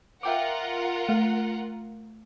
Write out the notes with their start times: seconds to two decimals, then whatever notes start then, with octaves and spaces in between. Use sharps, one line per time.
0.23 F4 A#4 E5 F#5 G5 D6
1.09 A3 F5